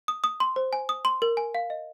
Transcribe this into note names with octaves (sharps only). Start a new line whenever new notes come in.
D#6
D#6
C6
C5
G#5
D#6
C6
A#4
G#5
F5
D#5